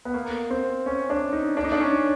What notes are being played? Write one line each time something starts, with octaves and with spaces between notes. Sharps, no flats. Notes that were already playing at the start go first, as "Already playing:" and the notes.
B3
A#3
C4
C#4
D4
D#4
D4
D#4
D4
C#4